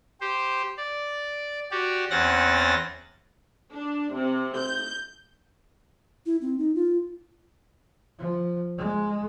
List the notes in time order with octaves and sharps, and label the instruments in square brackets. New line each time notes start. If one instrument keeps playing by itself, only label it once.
[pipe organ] G4 C5
D5
F#4 G4 D5
E2 C4 C#4 F#5 A6 A#6
[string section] D4
C3
G6
[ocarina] E4
C4
D#4
F4
[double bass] F3
G#3